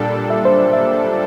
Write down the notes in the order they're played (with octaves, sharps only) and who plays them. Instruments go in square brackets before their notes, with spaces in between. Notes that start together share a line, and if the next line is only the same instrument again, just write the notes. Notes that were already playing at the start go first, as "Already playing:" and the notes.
Already playing: [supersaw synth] A#2 G3 D4 A4 [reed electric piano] D5
[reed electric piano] E5
C5
D5
E5